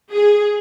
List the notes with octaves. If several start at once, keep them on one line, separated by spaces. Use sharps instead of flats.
G#4